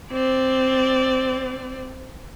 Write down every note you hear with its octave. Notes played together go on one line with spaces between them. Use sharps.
C4 D5